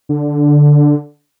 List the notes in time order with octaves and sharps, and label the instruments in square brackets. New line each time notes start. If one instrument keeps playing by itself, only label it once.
[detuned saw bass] D3